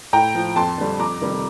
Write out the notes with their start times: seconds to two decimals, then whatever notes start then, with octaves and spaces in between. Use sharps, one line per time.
0.13 A2 G5 A#5
0.35 F3
0.56 F2 A5 C6
0.78 D3 G3
0.99 F2 A#5 D6
1.21 C3 D#3 G3